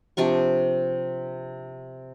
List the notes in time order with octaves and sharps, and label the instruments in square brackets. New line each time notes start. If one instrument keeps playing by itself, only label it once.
[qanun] C3 F3 D4 C#6